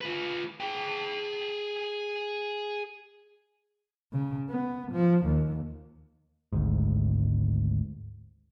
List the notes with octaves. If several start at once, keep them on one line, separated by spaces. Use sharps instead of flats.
F4 B4
G#4 G5
C#3
B3
F3
D#2
G#1 D2 G#2